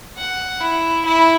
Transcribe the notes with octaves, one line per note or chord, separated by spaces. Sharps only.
F#5
E4
E4